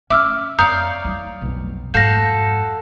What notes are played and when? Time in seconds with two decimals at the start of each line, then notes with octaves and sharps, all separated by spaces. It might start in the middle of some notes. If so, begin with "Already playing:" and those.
0.10 C#4 E5 D6 E6 F6
0.59 F2 C#5 D5 F5 A#5 D#6 G6
1.05 G3 D#4
1.42 B1 F2
1.94 F2 G#2 F#4 A4 F5 G6 A#6